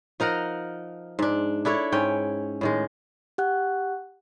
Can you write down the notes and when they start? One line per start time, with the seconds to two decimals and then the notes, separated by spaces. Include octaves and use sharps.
0.20 F3 D#4 A#4 F#5
1.19 G#2 D4
1.65 D4 E4 A4 C#5
1.92 G#2 C#4 G5
2.61 A2 D#3 G#3
3.38 G4 F#5 F#6